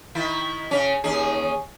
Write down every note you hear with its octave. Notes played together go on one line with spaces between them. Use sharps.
D#3 E4
C#3 C#4
D#2 C#4 G#4